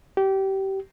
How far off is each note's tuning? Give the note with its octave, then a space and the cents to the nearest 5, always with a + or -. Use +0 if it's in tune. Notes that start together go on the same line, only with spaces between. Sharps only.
G4 -25